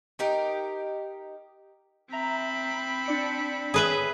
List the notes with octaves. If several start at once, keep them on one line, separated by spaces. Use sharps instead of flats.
D#4 G4 A#4
C4 E5 A#5 B5
D4 D5 C#7
G#4 B4 C#5 E5